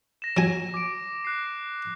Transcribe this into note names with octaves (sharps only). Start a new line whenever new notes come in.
A#6 E7
F#3 G#5
D6 D7
F#6 C7